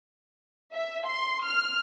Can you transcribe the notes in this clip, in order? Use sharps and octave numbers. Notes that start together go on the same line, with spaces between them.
E5
C6
F6